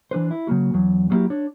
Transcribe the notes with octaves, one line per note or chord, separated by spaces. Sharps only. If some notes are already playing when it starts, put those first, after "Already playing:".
E3 D4 B4 C5
E4
C#3 F#3 A#3 F#4
E2 F#3
F#3 G3 A#3 E4 F#4 G4
D4 C#5